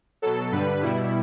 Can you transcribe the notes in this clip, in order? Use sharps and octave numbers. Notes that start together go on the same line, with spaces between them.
B2 F#3 A4
G2 D3 G3 B4
B2 G3 E4